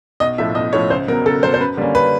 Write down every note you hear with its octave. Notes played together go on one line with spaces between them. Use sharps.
B1 D#5
A2 F3 E5
B1 D#5
A2 F3 C#5
C#2 C5
B2 F#3 A#4
C#2 A4
B2 F#3 C5
C5
F#2 B4
D3 G3 A#3 C#4
B4